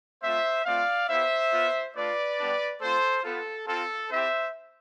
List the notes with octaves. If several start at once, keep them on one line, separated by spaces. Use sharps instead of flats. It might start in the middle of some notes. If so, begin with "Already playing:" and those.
A3 C4 F4 C5 E5
A3 C4 F4 D5 F5
B3 E4 G4 C5 E5
B3 F4
A3 D4 F4 B4 D5
G3 B3 D4 G4
A3 C4 F4 A4 C5
B3 F4 A4
C4 F4 A4
C4 E4 G4 C5 E5